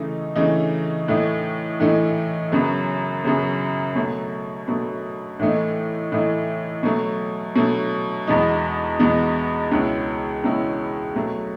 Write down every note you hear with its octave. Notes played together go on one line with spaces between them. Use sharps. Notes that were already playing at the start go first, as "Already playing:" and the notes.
Already playing: C#3 E3 A3 D#4
C#3 E3 A3 D#4
A2 E3 A3 D#4
A2 E3 A3 D#4
F#2 C#3 F#3 B3
F#2 C#3 F#3 B3
B2 F#3 A3
B2 F#3 A3
A2 E3 A3 D#4
A2 E3 A3 D#4
B2 F#3 A3
B2 F#3 A3
E2 B2 G#3 B3 D#4
E2 B2 G#3 B3 D#4
C#2 B2 G#3 C#4 E4
C#2 B2 G#3 C#4 E4
B2 F#3 A3